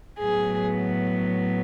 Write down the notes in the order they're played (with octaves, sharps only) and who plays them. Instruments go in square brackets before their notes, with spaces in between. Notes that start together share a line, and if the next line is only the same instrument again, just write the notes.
[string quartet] A2 F#3 B3 G#4